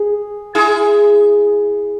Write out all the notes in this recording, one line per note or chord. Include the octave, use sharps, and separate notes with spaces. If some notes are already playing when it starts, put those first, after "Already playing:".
Already playing: G#4
E4 G#4